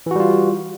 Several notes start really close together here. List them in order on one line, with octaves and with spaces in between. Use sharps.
E3 F#4 G3 F4